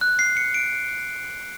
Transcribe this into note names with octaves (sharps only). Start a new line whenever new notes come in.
F#6
C7
C#7
D7